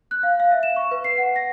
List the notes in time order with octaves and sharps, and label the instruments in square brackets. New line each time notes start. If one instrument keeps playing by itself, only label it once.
[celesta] F#6
F5
F5
E5
E7
C#6
B4
C7
F#5
A#6